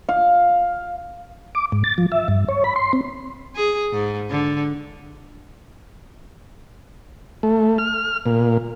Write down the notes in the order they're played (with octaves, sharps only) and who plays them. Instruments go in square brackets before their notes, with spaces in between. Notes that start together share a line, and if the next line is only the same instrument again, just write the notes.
[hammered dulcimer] F5
[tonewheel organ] D6
G#2
A6
F3
E5
G2
C#5
B5
C6
C4
[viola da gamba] G#4
G#2
D3
[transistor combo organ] A3
F6
A#2